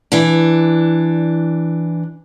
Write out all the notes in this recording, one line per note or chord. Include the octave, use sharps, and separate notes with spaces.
E3 D4